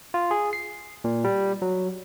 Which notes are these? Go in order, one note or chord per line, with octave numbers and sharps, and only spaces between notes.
F4
G#4
C7
A#2
G3
F#3